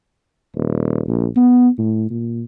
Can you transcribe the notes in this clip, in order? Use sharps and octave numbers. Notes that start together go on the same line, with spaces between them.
D#1
A#1
B3
A2
A#2